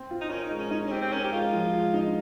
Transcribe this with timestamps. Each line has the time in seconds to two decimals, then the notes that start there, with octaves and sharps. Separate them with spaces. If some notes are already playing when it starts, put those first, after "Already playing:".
Already playing: C4
0.11 F4
0.21 D#4
0.30 C#4 A#4
0.44 D#4
0.51 G#3
0.58 C#4
0.71 C#4 D#4
0.86 C#4
0.91 C4 G4
1.02 C4
1.12 C#4 A#4
1.24 G4
1.32 G#3 F4
1.53 F3
1.73 G#3
1.94 D#4